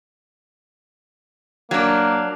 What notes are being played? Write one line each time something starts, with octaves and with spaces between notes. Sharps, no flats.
F#3 A#3 D4